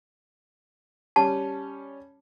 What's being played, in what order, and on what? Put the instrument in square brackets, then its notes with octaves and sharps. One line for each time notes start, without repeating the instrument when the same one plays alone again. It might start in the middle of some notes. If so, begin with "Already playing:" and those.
[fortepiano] G3 C#4 [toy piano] A5